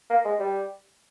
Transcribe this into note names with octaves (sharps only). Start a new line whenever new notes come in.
A#3
G#3
G3